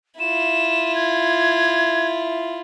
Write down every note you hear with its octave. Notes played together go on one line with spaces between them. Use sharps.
E4 F4 E7
G#6